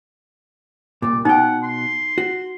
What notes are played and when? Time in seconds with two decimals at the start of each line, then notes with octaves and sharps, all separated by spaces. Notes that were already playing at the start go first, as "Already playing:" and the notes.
1.02 C2 A#2 D5
1.25 B2 D#4 F#5 G5
1.64 C6
2.18 F#4